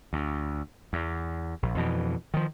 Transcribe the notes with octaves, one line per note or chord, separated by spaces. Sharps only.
D2
E2
A#1
F2 B2 E3
D#3 F3